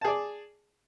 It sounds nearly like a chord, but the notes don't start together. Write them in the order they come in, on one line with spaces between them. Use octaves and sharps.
A5 G#4 D5